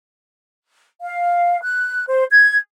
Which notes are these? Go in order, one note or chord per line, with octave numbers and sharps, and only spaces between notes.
F5
F#6
C5
G#6